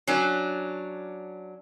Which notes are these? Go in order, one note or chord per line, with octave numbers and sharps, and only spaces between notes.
F#3 C#4 D4